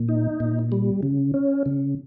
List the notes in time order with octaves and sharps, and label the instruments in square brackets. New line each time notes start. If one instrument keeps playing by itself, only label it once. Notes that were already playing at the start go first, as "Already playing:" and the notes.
Already playing: [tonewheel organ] A#2
D#4
A#2
G3
C#3
C#4
C#3